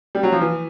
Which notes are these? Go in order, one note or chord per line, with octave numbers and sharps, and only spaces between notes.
G3
F#3
F3
E3